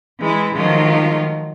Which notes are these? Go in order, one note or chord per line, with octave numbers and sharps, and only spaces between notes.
E3 G#3 E4
D#3 F3 F#3 G#3 A3 F4